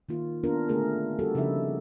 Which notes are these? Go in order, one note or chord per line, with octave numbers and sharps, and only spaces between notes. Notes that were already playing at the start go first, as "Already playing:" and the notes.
D#3 A#3 F4
A#3 B3 D4 F4 A#4
D3 A3 A#3 G#4 A#4
G3 A3 F#4 G4 A4
C#3 F3 D#4 E4 E5